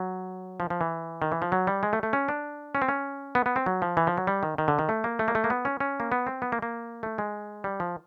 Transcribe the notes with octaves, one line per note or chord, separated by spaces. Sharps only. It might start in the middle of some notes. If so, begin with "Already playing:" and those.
Already playing: F#3
F3
F3
E3
D#3
E3
F3
F#3
G3
G#3
A3
A3
C#4
D4
C#4
C4
C#4
B3
B3
C4
F#3
F3
E3
F3
F#3
G3
D#3
D#3
D3
D#3
A3
A#3
A3
A#3
A3
A#3
B3
C#4
C#4
A#3
B3
C4
B3
A#3
A#3
A3
G#3
G3
F3